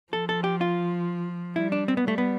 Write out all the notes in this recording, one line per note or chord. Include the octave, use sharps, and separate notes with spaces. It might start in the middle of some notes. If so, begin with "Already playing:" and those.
F3 A4
A4
G4
F4
G3 E4
D4
C4
B3
G3 A3
B3